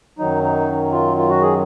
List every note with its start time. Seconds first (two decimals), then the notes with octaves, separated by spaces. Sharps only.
0.19 F#2 D#3 F#3 D#4
0.43 D#4
0.92 F4
1.17 F4
1.30 F#4
1.42 G#4